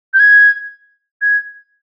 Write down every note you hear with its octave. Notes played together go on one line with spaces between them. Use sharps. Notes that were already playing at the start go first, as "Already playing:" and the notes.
G6
G#6
G#6